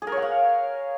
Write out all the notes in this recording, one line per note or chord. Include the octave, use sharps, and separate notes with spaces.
G#4
A#4
C#5
F#5
F5